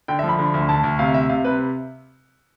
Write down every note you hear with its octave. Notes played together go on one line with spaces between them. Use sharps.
D3 G5
E5
F3
B5
D3
D2
D2 A5
D2
C3 F5
C3 E5
C3 F5
C3 B4